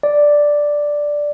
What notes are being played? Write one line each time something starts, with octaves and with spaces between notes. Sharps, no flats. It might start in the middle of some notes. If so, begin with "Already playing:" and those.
D5